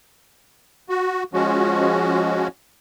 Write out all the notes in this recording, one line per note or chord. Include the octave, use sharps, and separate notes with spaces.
F#4
F3 G#3 C#4 F#4